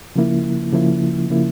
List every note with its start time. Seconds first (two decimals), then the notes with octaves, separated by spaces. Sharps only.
0.16 C#3 F3 A#3 E4
0.73 C#3 F3 A#3 E4
1.30 C#3 F3 A#3 E4